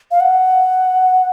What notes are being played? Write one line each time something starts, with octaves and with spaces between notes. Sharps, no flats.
F5
F#5